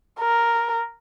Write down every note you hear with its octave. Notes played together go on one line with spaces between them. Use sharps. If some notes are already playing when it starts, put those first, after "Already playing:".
A#4